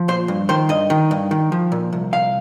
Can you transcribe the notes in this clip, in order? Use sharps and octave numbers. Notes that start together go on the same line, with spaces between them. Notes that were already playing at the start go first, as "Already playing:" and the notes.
Already playing: F3
A#2 C5
G2
D#3 C5
G2 D#5
D#3
G2
D#3
F3
A#2
C2
C2 F5